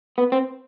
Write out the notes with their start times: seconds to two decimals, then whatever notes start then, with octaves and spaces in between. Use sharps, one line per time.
0.18 B3
0.32 C4